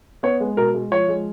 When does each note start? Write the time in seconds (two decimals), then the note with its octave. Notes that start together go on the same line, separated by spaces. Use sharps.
0.23 B3 C#5
0.40 G#3
0.57 B2 A#4
0.74 G#3
0.91 F3 C#5
1.09 G#3